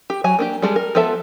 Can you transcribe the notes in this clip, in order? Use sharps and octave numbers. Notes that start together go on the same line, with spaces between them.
G4
F#3 G#5 A#5
A#3 D4 G4
G3 G#3 A4
A#4
F3 B3 A4 E5 A5